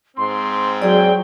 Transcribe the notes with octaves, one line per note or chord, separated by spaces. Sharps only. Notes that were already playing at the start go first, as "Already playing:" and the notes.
G#2 C4 C6
F#3 G#4 D5 G5